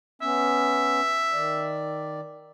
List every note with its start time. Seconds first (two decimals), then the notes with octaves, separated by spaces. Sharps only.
0.22 B3 C#4 E5
1.33 D#3 D5